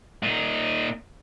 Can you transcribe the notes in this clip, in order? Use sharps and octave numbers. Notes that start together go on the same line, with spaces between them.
A#2 D#4